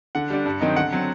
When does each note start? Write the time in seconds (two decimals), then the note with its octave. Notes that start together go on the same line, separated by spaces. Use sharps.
0.15 D3 F#5
0.30 G3 D4
0.46 G2
0.61 D#3 F#3 C4 D#4
0.76 D3 F#5
0.92 F#3 C4